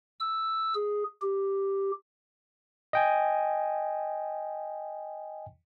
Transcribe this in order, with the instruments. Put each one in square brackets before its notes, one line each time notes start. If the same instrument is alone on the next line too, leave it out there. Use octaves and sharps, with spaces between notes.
[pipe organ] E6
G#4
G4
[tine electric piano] D#5 G5 G#5